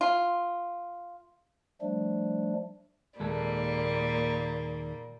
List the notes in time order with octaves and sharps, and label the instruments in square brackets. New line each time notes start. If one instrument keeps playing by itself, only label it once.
[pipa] F4
[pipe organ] F3 G3 A3 D4
[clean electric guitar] D#2 G#3 A4 [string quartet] A#2 G3 A#3